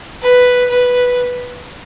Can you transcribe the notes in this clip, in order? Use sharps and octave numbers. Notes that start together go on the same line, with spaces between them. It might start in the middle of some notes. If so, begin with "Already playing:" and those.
B4
B4